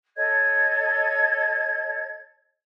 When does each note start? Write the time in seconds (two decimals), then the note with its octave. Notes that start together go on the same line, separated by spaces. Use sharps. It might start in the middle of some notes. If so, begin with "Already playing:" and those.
0.17 A4 C#5 D#5 G#6